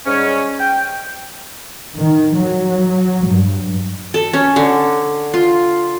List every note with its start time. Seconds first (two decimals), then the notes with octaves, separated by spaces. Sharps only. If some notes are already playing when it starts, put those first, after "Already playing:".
0.06 G#2 G3 C#4
0.60 G5
1.96 D#3
2.38 F#3
3.26 G2
4.14 A4
4.33 C#4
4.56 D3
5.34 F4